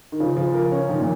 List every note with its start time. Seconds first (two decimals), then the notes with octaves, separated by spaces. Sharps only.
0.12 D#3
0.20 C#3 F3
0.37 F3
0.54 A#4
0.72 C#4
0.89 D#3 F3
1.00 A#2